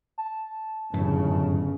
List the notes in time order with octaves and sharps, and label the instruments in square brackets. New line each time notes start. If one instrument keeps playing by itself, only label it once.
[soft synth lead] A5
[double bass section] G1 C#3 [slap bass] F#2 A2 E3